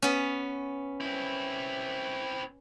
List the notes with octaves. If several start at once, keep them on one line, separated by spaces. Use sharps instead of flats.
B3 C#4
C4 E4